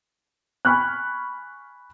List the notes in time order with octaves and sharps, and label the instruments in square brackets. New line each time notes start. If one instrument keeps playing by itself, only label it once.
[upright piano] G#5 B5 C#6 F6 F#6